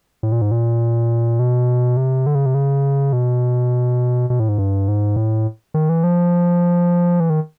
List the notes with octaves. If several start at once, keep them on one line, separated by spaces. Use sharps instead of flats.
A2
A#2
G#2
A#2
B2
C3
D3
C#3
C3
C#3
B2
B2
A2
G#2
G2
G#2
A2
D#3
E3
F3
E3
D#3